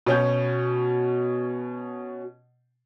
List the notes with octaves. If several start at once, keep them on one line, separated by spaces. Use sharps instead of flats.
B2 C#4 G6